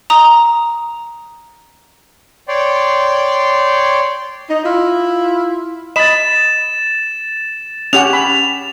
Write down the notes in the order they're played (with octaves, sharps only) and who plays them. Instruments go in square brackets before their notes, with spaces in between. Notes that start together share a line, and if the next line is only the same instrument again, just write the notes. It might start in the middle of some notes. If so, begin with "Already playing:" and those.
[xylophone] A#5 D#6
[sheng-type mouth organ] C#5 D5 G5 C6
[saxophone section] D#4
E4 F4
[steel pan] D#5 B5 [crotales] A6 E7
[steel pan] C#4 G4 F#5 [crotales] F7
[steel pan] B5